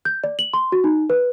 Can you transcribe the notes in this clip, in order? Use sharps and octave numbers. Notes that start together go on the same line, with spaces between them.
G6
D5
F#7
C6
F#4
D#4
B4